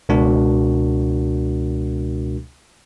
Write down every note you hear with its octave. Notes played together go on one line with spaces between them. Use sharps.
C#2 B2 G#3 D4 F#4 A#4